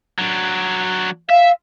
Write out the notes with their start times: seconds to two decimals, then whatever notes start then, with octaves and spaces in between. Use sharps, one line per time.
0.18 F#3 D4
1.30 E5 F5